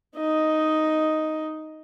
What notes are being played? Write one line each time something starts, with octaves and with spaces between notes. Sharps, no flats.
D#4 D#5